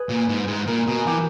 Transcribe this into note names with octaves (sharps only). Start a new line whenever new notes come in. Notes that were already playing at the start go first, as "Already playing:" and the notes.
Already playing: G#4 B4
A#2
G#2
G#2
A#2 A#4
B2 G#4
E3 G4